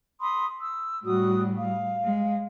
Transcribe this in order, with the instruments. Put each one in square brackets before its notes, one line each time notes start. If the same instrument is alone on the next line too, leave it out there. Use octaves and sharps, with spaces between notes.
[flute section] B5 C6 D#6
E6
[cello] A2 G3 [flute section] F#4 D#6
[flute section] F5
[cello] G#3